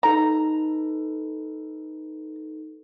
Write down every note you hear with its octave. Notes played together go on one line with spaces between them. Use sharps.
D#4 A4 B4 A#5